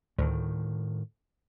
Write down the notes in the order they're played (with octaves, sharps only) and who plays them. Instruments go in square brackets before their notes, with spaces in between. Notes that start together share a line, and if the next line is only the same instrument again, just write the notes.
[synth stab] D2 [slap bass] A2 D#3